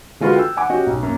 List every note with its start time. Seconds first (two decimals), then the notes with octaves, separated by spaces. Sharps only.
0.20 D3 G#3 F4 F#4 B4
0.36 G5 E6
0.57 F#5 G#5 D6
0.70 C#4 F#4 G4 D#5 G5
0.86 B1
1.02 F#2 A#3